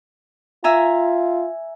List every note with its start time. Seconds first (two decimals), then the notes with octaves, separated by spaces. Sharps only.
0.64 F4 E5 G#5 A#5